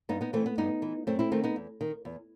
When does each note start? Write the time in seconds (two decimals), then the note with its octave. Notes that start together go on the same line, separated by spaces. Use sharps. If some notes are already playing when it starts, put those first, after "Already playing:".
0.09 G2 B3 D#4
0.21 B3 D#4
0.33 E3 A3 C4
0.46 B3
0.58 G2 B3 D#4
0.82 E3
1.07 F#2 A3 C4
1.19 C4 E4
1.31 D#3 A3 C4
1.44 B3 D#4
1.56 E2
1.81 D#3
2.05 E2